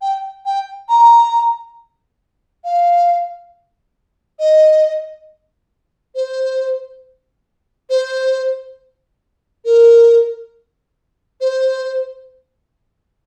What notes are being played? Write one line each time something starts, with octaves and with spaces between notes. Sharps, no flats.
G5
G5
A#5
F5
D#5
C5
C5
A#4
C5